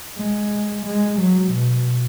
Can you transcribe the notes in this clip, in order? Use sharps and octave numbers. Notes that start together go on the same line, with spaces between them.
G#3
G#3
F#3
B2